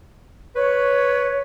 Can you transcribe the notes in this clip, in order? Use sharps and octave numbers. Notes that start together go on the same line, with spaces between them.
B4 C#5